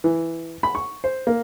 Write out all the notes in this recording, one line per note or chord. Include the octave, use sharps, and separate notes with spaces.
E3
B5
C#6
C5
A#3